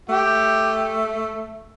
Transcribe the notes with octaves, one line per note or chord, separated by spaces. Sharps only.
A3 G4